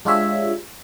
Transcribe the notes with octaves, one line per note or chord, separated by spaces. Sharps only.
G#3 D4 F4 G4 C#5 E5